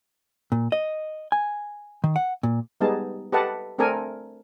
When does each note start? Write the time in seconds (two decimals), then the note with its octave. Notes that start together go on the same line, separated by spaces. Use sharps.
0.52 A#2
0.72 D#5
1.32 G#5
2.04 D#3
2.16 F#5
2.43 A#2
2.81 G3 G#3 B3 D#4 G#4 A5
3.32 G4 A4 B4 D#5 F#5 A5
3.78 A3 C4 D4 A4 A#4 G#5